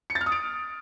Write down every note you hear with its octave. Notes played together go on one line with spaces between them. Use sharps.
C#7
A6
F6
D#6
D7